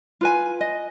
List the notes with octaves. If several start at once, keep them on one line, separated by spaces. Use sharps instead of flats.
F4 B4 G#5
D#5